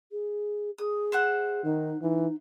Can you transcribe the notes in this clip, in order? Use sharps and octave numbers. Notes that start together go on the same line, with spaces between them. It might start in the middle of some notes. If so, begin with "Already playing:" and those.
G#4
G#4 D#6
C5 E5 F#5
D#3 D#4
E3 D#4